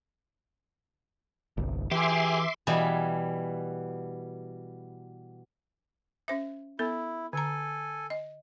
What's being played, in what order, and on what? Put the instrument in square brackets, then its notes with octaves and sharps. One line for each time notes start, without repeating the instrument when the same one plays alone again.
[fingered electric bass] G1 C2
[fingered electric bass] E3 [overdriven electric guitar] G4 G#4 [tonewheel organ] E5 C6 D6
[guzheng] B2 E3 G3 E5 G#5
[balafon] C#4 C5 E5
[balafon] B3 A4 [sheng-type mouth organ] E4
[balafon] D3 A#5 [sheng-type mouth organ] A4 G#5
[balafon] D#5